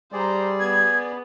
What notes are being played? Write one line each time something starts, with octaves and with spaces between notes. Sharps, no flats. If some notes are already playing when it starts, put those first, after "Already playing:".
G3 G#4 C5 D5 A#5
B3 G#6